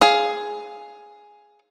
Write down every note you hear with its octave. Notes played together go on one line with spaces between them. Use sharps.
G#4 F5